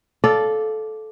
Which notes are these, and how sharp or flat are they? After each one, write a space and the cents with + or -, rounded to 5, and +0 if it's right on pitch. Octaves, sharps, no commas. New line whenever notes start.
A4 -15 D5 +0 F5 +0